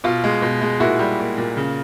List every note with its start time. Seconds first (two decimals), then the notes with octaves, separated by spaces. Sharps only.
0.04 B2 F4
0.24 G#3
0.42 B2
0.61 G#3
0.80 A#2 E4 F#4
0.99 G3
1.19 A#3
1.38 A#2
1.57 C#3